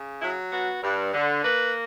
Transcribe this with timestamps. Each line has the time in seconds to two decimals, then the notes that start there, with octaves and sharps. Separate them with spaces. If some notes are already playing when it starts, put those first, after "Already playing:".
Already playing: C#3
0.21 F#3 E4
0.52 B3 F#4
0.83 G2
1.14 D3
1.44 A#3 B4